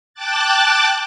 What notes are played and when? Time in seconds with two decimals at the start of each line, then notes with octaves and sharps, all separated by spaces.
0.14 G5 A5 D6 F#6 A6